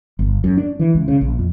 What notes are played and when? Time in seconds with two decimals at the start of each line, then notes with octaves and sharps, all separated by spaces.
0.19 G1
0.44 F#2
0.57 D4
0.79 E3
0.95 C#2
1.08 C#3
1.21 A#1
1.39 F2